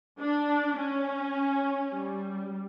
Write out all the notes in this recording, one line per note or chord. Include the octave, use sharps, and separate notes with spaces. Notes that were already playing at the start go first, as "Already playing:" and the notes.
D4
C#4
G3